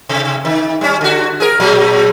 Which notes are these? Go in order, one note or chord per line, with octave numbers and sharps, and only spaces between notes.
C3
D#3
G3 C#4
D3 F#4
G#4 A#4
A#2 F#3 G#3